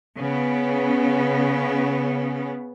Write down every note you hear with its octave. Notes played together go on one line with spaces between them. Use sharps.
C#3 B3